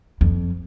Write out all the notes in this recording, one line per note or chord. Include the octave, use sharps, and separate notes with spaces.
F2